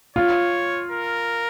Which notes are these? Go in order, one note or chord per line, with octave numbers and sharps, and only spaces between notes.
F4 C#5
A#4